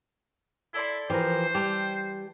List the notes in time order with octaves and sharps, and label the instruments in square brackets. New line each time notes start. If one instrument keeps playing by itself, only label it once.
[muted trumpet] E4 [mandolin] A4 D5 C6
[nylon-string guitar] E3 F3 [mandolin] G4 A#4 [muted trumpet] C5
[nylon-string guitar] G3 [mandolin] G4 A5 G6